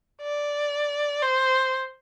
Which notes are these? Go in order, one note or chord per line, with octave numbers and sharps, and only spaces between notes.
D5
C5